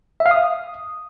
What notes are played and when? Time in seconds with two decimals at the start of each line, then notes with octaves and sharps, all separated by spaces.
0.20 E5
0.26 F5
0.31 D#6